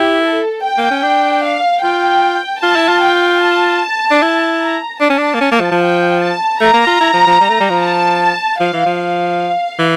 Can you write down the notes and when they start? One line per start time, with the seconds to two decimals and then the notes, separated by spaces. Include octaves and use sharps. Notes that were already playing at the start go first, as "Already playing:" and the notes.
Already playing: E4 G4
0.24 A4
0.64 G5
0.77 A#3
0.91 C#4
1.03 D4
1.43 F5
1.83 F4 G5
2.63 F4 A5
2.76 E4
2.88 F4
3.02 G5
3.42 A5
4.11 D4
4.22 E4
4.62 A#5
5.01 D4 A5
5.10 C#4
5.18 D4
5.34 A#3
5.41 C#4
5.52 A#3
5.60 F3
5.71 F3
5.81 G5
6.20 A5
6.60 A3 A#5
6.73 A#3
6.87 F4
7.00 E4
7.13 F3
7.27 F3
7.40 G3
7.50 A3
7.60 G3
7.70 F3
7.80 A5
8.59 F3 F5
8.73 E3
8.86 F3
8.99 F5
9.79 E3